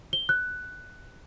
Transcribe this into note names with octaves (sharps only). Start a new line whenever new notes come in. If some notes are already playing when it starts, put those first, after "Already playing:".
G7
F#6